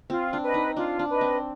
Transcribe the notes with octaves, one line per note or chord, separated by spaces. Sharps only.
C4 F4
D4
B4 D#5
D#4
D4 F4
D4
B4 D#5
C4